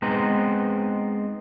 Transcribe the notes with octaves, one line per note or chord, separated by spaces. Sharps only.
G#3 B3 C4 D#4 A#5